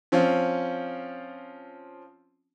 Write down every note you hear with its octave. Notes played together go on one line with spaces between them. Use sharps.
F3 C4 C#4 F4